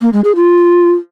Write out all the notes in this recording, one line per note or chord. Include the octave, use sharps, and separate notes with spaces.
A#3
G#3
G#4
F4